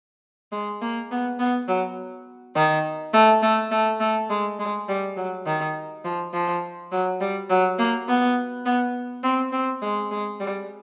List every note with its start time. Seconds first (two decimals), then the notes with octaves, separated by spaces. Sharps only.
0.52 G#3
0.81 A#3
1.11 B3
1.39 B3
1.68 F#3
2.56 D#3
3.13 A3
3.42 A3
3.71 A3
4.00 A3
4.30 G#3
4.59 G#3
4.88 G3
5.17 F#3
5.46 D#3
6.04 F3
6.33 F3
6.92 F#3
7.21 G3
7.50 F#3
7.78 A#3
8.08 B3
8.65 B3
9.23 C4
9.52 C4
9.82 G#3
10.11 G#3
10.40 G3